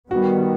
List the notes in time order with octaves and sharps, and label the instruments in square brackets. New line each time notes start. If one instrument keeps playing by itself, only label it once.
[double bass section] D#3 G3 B3 [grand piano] F#4